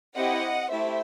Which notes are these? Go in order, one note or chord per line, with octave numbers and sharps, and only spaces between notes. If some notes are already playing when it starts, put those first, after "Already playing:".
C4 E4 G4 D#5 F#5
A3 E4 G4 C5 E5